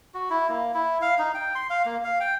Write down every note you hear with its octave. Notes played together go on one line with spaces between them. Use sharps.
F#4
E4
A#3
E4
F5
D#4
G5
C6
F5
A#3
F5
G5